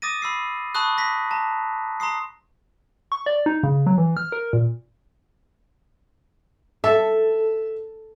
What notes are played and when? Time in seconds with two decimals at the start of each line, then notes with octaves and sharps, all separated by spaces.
0.02 D6 D#6 A6 A#6 D#7
0.22 B5 E6 C7
0.75 A5 B5 C#6 D#6 F#6
0.97 D#6 A#6 B6
1.31 A5 A#5
2.00 A#5 C6 D#6 C7
3.12 C#6
3.26 D5
3.46 D#4
3.63 C#3
3.86 F#3
3.98 E3
4.17 F6
4.32 A#4
4.53 A#2
6.84 A4 E5